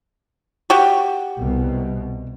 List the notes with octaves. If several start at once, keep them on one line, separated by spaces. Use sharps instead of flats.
F#4 G4
C2 B2